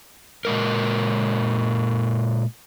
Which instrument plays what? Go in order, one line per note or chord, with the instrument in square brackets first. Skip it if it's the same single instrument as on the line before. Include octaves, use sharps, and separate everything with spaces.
[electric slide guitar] A#2 G#3 A#4